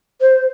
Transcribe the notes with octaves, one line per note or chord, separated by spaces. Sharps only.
C5